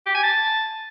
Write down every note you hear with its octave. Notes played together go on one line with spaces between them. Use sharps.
G4
G#5
A5